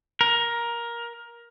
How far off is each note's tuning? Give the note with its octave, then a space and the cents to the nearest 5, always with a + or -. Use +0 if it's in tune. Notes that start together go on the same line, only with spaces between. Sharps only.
A#4 +15